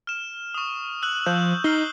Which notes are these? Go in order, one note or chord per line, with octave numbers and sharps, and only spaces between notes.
F6 E7
C#6 D#6
E6 F#6 F#7
F3 G6
D#4 F6 C7 G7